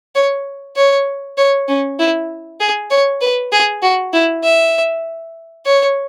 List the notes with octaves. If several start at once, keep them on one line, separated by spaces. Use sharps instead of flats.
C#5
C#5
C#5
C#4
E4
G#4
C#5
B4
G#4
F#4
E4
E5
C#5